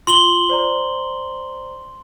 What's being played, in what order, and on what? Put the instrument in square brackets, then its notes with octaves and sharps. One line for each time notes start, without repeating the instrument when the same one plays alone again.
[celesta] F4 [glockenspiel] C6 F#7 G7
[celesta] C5 D5 A#5